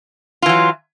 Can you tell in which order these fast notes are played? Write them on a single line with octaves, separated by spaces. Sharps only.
F4 E3 F#3